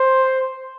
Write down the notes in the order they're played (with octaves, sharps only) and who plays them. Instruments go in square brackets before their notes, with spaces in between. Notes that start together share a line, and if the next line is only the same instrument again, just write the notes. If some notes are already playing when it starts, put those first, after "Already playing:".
Already playing: [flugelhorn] C5